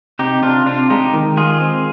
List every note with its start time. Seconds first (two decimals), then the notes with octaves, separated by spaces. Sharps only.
0.19 C3 D#4 G4
0.43 C3 D4 F4
0.66 C3 D4 F4
0.90 G#3 D#4 G4
1.13 D#3
1.37 G#3 F4 G#4
1.60 C4